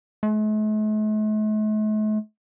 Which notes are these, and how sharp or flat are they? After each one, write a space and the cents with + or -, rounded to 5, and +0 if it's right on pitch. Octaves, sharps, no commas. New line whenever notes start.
A3 -45